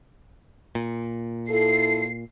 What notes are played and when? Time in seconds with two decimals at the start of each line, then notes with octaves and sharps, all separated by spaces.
0.75 A#2
1.50 E4 F4 A4 C7